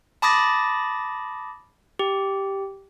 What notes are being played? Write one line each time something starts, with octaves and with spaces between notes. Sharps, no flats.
A5 B5 D6 D#6 A6 A#6
G4